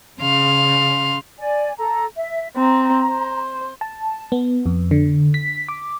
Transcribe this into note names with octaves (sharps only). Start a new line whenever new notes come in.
C#3 F5 C6
D5 G#5
A4 A#5
E5
C4 A#5
C5
A5
B3
F2
D3
B6
D6